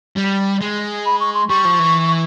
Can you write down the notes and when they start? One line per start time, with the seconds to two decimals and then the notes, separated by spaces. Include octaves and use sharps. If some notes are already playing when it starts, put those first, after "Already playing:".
0.16 G3
0.61 G#3
1.06 B5
1.20 C#6
1.34 C6
1.49 G3 C#6
1.65 F3
1.79 E3